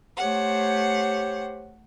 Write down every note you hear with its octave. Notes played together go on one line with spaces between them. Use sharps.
A3 G4 C5 C#5 F#5